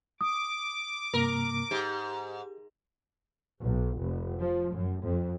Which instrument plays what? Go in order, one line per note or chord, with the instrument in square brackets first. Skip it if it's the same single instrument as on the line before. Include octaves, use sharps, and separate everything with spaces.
[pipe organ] D6 [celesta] D#6
[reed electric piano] G2 C3 A#3 [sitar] A#4
[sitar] G#2 [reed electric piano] G4
[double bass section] B1
F1
F3
F#2
F2